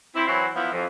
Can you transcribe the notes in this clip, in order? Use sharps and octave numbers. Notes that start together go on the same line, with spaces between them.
C4 E4
E3 F#3 C4 E4 F#4
F3 B3 E4
F2